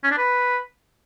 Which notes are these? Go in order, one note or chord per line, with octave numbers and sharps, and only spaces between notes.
C#4
D4
B4